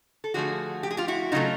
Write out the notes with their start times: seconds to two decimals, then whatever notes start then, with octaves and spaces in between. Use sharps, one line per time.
0.24 A4
0.34 D3 F3 A3 F#4 G#4
0.83 G4
0.91 G#4
0.97 F4 G4
1.08 E4 F#4
1.32 C#3 F#3 A3 D#4 F4